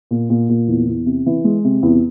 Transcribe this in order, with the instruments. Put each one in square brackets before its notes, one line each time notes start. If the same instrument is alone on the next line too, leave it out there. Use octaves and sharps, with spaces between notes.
[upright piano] A#2
A#2
A#2
E2
E2
C3
E3
G#3
C3
E2